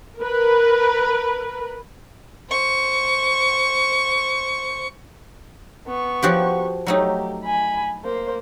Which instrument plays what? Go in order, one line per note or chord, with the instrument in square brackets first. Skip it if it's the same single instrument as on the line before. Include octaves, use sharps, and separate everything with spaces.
[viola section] A#4 B4
[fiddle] C5 C#6
[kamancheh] B3 C#6
[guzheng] F3 F#4 G4
[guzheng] F#3 A3 D#4 [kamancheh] G4
[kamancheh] G#5 B5
A#3 C5